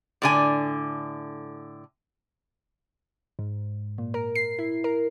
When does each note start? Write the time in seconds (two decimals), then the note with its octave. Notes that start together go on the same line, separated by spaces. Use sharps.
0.22 A2 D3 G#5
3.39 G#2
3.98 A#2
4.14 A#4
4.35 C7
4.59 E4
4.84 A#4